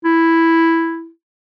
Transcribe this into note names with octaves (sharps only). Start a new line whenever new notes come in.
E4